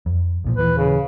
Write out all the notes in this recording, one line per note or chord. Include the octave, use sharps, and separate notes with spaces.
F2
B1 A#2 F3
D#1 E3 B4
C#3